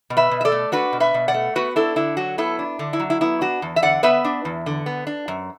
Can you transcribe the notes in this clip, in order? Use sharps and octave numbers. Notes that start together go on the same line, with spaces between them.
B2
B4 E5
B2
E5
A4 D5
A3
D4 F#4 B4
B2
B4 E5
B2
D5 F#5
A3
B3 F#4 B4
D4 E4 A4
D3 E4
F#3 F#4
B3 E4 A4
D4
D3
E4
F#3
E4
B3 E4
D4 F#4
E2
E5
D3 D5 F#5
B3 B4 E5
D4
E2
D3
B3
D4
F#2